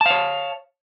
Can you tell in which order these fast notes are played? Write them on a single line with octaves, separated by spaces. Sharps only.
A5 F5 C#5